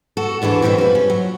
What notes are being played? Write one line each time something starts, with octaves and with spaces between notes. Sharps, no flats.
F#4 A4
D2 D3 E3 G#4 A4
F#2 B2 E3 G3 C4
F3 B4
C#4
F#3